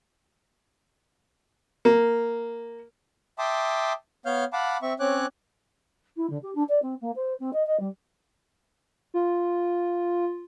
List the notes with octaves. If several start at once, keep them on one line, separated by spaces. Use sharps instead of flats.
A#3
E5 G5 A5 C6 D6 D#6
B3 C#5 F5 F6 G6
F5 F#5 A5 B5 D6
C4 E5 C#6
C4 C#4 C#5 D6 F#6
E4
D3
G4
D4
D5
C4
A#3
C5
C4
D#5
D#5
G3
F4